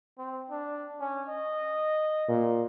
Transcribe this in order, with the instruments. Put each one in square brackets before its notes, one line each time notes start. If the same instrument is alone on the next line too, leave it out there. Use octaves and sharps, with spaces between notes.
[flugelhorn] C4
D4
C#4
D#5
[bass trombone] A#2